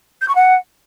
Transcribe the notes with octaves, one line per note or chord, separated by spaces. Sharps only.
G6
C#6
F#5